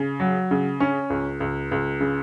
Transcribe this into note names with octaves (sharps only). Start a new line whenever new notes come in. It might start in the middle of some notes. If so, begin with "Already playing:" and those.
Already playing: C#3
F#3
C#3
C#4
C#2
C#2
C#2
C#3